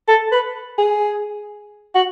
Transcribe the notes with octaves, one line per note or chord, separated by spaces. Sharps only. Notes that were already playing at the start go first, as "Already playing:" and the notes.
A4
B4
G#4
F#4